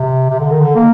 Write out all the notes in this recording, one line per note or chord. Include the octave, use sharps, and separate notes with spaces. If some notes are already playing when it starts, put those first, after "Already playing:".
Already playing: C3
C3
D3
D#3
D3
A#3